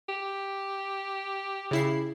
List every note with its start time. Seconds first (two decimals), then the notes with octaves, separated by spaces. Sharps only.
0.09 G4
1.71 C#3 E4 C7